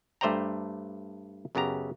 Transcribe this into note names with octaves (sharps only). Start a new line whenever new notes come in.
G2 A3 C5 D5 G5 A#5
F#2 C#3 B3 G4 A#5